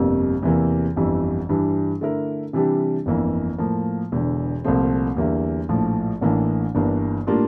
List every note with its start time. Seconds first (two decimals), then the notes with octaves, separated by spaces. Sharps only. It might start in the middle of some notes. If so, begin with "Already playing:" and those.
Already playing: G1 F2 C3 G3 A#3
0.43 E2 C3 E3 A#3
0.96 G1 F2 E3 G3
1.49 G2 E3 G3 D4
2.01 D3 A3 E4 A#4
2.53 C3 E3 G3 D4 G4
3.06 G1 F2 E3 A#3
3.58 A2 F3 A#3
4.12 E1 E2 D3
4.64 C2 A#2 F3 A3 C4
5.17 E2 D3 G3 A#3 E4
5.69 A#1 A2 F3
6.21 A1 A2 E3 A#3 D4
6.75 G1 G2 E3 A#3 D4
7.27 A2 G3 A#3 D4 F4